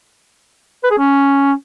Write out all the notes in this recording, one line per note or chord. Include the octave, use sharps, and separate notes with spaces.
B4
G#4
C#4